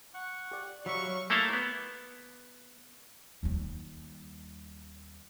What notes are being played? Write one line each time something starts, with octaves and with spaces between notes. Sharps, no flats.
F#5 C#6 F#6
G4 D5
F#3 E5 F5 B5 C#6
A3 A#3 E4 A4 F5
B3
D#2 G3